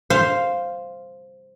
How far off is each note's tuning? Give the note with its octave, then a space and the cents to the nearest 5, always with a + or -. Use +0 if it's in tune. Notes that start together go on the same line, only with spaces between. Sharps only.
C5 +0 F5 +0